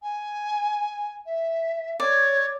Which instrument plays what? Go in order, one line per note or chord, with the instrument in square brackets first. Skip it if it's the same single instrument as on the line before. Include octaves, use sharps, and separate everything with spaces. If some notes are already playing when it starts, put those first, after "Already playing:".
[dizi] G#5
E5
[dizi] C#5 [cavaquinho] D5